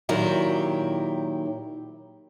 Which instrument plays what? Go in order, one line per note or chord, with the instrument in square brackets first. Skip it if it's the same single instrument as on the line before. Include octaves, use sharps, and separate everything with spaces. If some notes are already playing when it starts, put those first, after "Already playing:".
[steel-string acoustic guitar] A#2 D#3 F#3 E4 G4